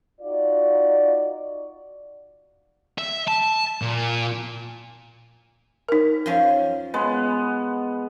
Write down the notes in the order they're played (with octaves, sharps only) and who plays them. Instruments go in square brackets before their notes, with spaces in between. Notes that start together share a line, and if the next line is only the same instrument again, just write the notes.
[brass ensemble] D#4 F4 F#4 D5
[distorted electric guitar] E5
A5
A#2
[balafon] D#4 A#4
[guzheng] F#2 F3 C#4
[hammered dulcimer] G#3 B3